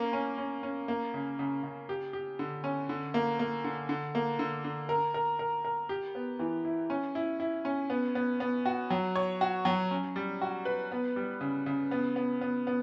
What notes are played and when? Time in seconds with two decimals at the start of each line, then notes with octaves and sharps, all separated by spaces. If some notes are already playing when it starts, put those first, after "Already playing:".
Already playing: A#3 C#4
0.13 C#4
0.38 C#4
0.63 C#4
0.88 A#3
1.14 C#3
1.39 C#3
1.63 C#3
1.89 G4
2.13 G4
2.39 D3
2.64 C#4
2.89 D3
3.14 A#3
3.39 A#3
3.64 D3
3.89 D3
4.15 A#3
4.39 D3
4.64 D3
4.89 A#4
5.14 A#4
5.39 A#4
5.65 A#4
5.89 G4
6.15 B3
6.39 E3
6.65 E4
6.90 C#4
7.15 E4
7.40 E4
7.65 C#4
7.90 B3
8.15 B3
8.40 B3
8.66 F#4
8.90 F#3
9.15 C#5
9.41 F#4
9.65 F#3
9.91 C#4
10.16 G3
10.42 F#4
10.65 B4
10.92 B3
11.16 G3
11.41 C#3
11.66 C#3
11.91 B3
12.16 B3
12.41 B3
12.67 B3